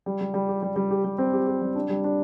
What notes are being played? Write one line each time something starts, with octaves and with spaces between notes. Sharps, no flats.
G3
G3
G3
G4
G3
G3
G4
G3
C4
G4
G4
G3
D4
G3
D4